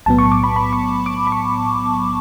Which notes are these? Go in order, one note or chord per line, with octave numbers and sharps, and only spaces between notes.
B1 A2 F#3 B3 A5
C#6
D6
B5
B5
C#6
D6
B5
C#6